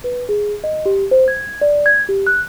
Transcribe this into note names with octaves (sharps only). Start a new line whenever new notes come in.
B4
G#4
D#5
G4
C5
G#6
D5
G#6
G4
F#6